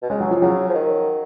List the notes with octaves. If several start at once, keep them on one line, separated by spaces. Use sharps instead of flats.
B2
C#3 G#3
F#3
F3
C#3 F#3
F3
D#3